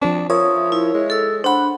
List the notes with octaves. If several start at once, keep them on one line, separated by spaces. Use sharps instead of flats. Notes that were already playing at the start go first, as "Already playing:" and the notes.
F3 C4 D4
F3 A#4 C#5 E5 D#6
E4
G#3
A4 E6
D4 C5 F#5 B5